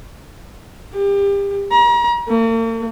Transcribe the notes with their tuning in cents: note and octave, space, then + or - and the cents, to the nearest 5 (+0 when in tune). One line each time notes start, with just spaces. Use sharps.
G4 +30
A#5 +35
A#3 -45